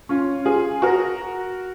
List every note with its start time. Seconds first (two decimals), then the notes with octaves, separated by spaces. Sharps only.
0.09 C#4 F4
0.45 F4 G#4
0.82 F#4 A#4